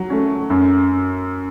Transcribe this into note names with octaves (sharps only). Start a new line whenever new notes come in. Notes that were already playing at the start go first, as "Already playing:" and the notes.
Already playing: F#3
A3 C#4
F#2